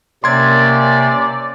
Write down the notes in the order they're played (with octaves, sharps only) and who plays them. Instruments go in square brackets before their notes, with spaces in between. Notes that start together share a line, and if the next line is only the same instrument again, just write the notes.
[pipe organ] C3 [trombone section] A#3 C#4 [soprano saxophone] D5 [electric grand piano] C6 G#6